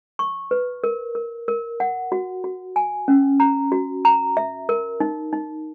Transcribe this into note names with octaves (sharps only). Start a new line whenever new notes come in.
C#6
B4
A#4
A#4
A#4
F#5
F#4
F#4
G#5
C#4
A#5
F#4
A#5
E5
A#4
D#4
D#4